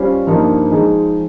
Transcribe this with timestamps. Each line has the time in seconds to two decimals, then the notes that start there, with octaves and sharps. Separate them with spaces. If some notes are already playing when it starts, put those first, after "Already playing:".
Already playing: G3 C#4 F4 C5
0.27 G2 F3 A#3 D#4
0.71 F3 G#3 D#4 G#4